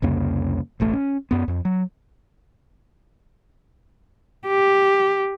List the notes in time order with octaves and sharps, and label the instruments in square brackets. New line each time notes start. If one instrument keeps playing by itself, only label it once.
[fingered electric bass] C2 F2 C#3 A#3
E1 A1 A3
C#4
F#2 B3
F2
F#3
[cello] G4